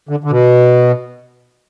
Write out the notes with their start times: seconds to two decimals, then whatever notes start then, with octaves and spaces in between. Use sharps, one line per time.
0.09 D3
0.24 D3
0.31 B2